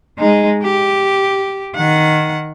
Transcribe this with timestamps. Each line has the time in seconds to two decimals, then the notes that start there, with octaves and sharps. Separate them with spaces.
0.19 G#3 D#4
0.63 G4
1.76 D#3 F#5